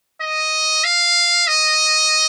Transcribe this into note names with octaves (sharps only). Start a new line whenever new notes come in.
D#5
F5
D#5